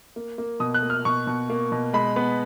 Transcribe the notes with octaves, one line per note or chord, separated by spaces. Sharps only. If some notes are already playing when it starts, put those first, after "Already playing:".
A#3
A#3
B2 D#6
F#6
A#3
F6
B2 C#6
B2
A#3
B2
G#3 B5
B3